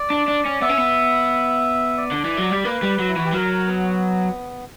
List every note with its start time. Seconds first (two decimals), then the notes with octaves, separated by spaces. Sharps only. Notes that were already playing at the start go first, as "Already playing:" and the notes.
Already playing: D5
0.10 D4
0.28 D4
0.45 C#4
0.61 B3 E5
0.69 C#4
0.77 B3
1.97 D5
2.11 D3
2.25 E3
2.38 F#3
2.52 G3
2.65 A#3 B4
2.82 G3
2.99 F#3
3.08 E4
3.16 E3 F#4
3.25 G4
3.33 F#3 A#4
3.67 B3